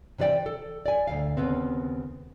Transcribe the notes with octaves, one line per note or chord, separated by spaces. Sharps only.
C3 E3 B4 D5 G5
A4
D5 G#5
D2 E3 F5
D#2 C#3 B3 C4